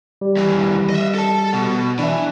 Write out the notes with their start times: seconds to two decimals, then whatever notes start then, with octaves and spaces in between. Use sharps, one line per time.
0.21 G3
0.37 D#2 E3
0.90 D#5 E5
1.15 A4 A5
1.53 B2
1.99 E3 D4 E5